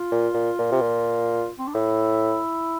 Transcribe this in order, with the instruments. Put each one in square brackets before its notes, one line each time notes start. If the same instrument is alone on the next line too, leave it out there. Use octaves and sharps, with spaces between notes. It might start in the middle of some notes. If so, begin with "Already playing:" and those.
Already playing: [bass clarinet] F4
[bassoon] A#2
A#2
A#2
C3
A#2
[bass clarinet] C4
D4
[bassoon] A2 [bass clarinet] E4